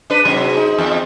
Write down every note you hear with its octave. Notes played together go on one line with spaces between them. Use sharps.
D4 B4
G#2 C3 F#3
D#4
E2